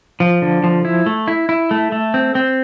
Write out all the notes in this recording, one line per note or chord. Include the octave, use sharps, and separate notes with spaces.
F3
D3
F3
E4
A3
E4
E4
A3
A3
C4
C4